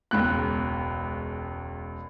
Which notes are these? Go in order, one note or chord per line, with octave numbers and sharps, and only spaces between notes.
E1 C#2 F#6